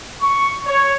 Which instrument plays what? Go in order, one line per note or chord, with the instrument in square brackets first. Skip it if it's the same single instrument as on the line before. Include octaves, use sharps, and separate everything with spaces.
[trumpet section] C#6
C#5